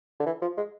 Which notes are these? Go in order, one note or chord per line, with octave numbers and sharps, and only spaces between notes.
D3
E3
F3
G#3